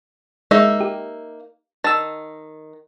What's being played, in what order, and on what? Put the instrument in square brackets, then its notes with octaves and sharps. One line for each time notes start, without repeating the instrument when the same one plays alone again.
[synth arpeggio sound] G#3 [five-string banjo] A#3 D#4 E5
[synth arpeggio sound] G4
[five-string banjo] D#3 [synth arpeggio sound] A5 E6